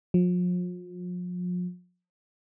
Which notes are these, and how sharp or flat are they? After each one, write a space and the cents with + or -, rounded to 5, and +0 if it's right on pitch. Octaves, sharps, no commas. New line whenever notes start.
F3 +40